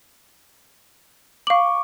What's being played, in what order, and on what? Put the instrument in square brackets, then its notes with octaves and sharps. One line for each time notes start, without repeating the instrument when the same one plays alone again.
[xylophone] F5 F#7 [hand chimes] C#6 D6